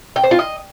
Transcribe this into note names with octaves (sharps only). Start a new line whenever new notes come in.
G5
C5
F4
D#5